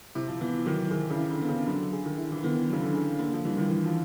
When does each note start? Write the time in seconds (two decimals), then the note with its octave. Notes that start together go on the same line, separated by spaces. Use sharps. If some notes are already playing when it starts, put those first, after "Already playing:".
0.15 C3 E4
0.28 F3
0.41 E3 B3
0.66 D#3 F#3
0.91 D#3 G#4
1.10 C#3
1.17 E4
1.29 D3
1.42 B3
1.49 C#3
1.67 D3 F#3
1.93 G#4
2.06 D#3
2.18 E4
2.32 E3
2.43 D#3 B3
2.69 C#3 F#3
2.81 D3
2.94 G#4
3.19 D3 A#3
3.33 F3
3.45 E3 G3
3.57 D#3
3.70 E3
3.86 F3